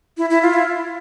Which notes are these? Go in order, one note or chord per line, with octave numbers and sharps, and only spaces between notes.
E4
E4
F4
E4